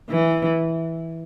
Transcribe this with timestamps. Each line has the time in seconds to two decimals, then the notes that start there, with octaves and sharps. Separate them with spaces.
0.10 E3